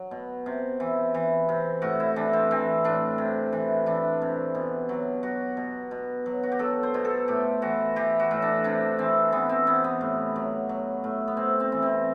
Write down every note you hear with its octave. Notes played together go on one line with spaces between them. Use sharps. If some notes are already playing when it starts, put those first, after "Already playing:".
Already playing: F#3
B2
C3
E3
E3
C3
A2 F#4
E4
E3 D4
C4
E3 C4
A2 D4
C3
E3
E3 D4
C3
B2
F#3
F#3 F#4
B2
B2
F#3
F#4
G4
F#3 A4
C5
B2
A4
A2 G4
E3 F#4
E3 G4
F#4
A2
D4
C3 D4
E3 C4
E3 B3
C4
C3 B3
B3
A2
F#3
F#3
A2
B3
C3 C4
C4
E3
C4